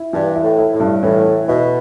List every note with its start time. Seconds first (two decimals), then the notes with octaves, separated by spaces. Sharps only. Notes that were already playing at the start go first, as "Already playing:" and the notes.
Already playing: E4
0.13 G2 E3
0.36 E4
0.43 A2
0.59 E4
0.73 A2
0.80 G2
1.03 A2 E3
1.26 E4
1.48 B2 E4